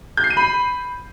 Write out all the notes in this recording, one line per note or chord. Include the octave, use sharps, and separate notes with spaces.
G6
C7
D#7
B5